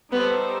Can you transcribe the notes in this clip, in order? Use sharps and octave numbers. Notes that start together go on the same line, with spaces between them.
G3 B3 D#4 A4 C5